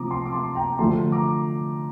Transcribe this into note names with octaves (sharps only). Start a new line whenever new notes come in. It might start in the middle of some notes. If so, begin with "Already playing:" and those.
Already playing: C3 F3 A3 A#5 D6 D#6
A5 C6
D6
A5 C6
G5 A#5
D3 F3 A3 A5 C6
A#5 D6